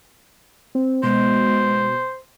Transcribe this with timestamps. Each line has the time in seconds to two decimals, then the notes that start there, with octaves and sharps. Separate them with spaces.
0.75 C4
1.03 B2 G#3 C5